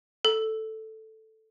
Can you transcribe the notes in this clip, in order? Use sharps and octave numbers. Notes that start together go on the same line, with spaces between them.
A4